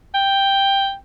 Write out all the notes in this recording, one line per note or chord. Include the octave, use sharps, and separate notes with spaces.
G5